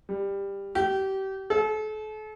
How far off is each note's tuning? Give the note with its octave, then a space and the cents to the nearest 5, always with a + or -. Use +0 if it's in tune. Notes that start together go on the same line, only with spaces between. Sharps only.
G3 +15
G4 -30
A4 -40